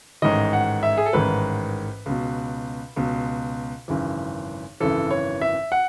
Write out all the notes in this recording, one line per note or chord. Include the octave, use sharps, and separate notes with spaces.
A1 G#2 D#3 D#5
F#5
E5
G#4
A4
A1 G#2 D#3 B4
C#2 B2
C#2 B2
G#1 F#2 C#3 E3
G#1 F#2 C#3 E3 A4
C#5
E5
F#5